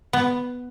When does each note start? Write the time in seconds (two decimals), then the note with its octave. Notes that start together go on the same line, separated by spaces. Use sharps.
0.13 B3